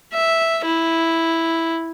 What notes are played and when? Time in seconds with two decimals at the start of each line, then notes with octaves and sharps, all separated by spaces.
0.13 E5
0.65 E4